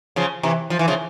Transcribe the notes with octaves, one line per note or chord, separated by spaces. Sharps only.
C#3 F3
C3 E3
F3
E3
C#3 F3